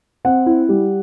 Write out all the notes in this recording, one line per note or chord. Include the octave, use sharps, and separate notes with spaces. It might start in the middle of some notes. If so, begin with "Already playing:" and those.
C4 F#5
E4
G3